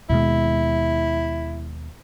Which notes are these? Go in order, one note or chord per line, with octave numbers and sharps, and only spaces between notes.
D#2 B2 G#3 E4